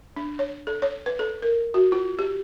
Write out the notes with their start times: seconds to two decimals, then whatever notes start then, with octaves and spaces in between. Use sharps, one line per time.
0.16 D4
0.39 C#5
0.67 A4
0.82 C#5
1.06 B4
1.19 A4
1.42 A#4
1.74 F#4
1.92 F4
2.19 G4